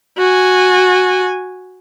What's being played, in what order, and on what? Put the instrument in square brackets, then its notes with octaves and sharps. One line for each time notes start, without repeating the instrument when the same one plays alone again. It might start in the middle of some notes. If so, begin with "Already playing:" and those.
[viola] F#4 G#5